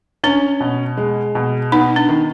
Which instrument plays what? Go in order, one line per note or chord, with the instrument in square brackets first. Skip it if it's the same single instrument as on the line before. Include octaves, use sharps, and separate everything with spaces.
[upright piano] C#4 [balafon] D4
[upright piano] B2
G#3
B2
[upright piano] B3 [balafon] D#4
[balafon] D4
[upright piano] D#3